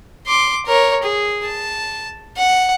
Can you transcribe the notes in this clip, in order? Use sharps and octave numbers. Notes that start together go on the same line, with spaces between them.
C6 D6
A#4 C#5
G#4
A5
F#5